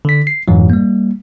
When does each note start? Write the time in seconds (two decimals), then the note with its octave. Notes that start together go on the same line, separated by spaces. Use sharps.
0.05 D3 B6
0.27 C7
0.48 F2 G#2 E3 F#3
0.70 G3 A#3